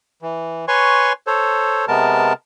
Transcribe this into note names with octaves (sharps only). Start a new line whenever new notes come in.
E3
B4 C#5 G#5 C6 C#6
A4 C5 C#5
C3 G#3 B3 A#4 A5